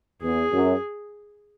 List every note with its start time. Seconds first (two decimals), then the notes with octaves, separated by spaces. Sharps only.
0.22 E2 G#4
0.52 F#2